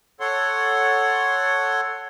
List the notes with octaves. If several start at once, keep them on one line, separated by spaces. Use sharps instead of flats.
A4 C#5 F#5 C6